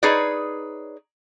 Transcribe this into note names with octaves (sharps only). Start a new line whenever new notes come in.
D#4 G#4 B4 C#5 D5